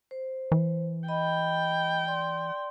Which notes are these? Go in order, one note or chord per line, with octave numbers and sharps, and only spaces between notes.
C5
E3
D#5 G5 B5
D5 C6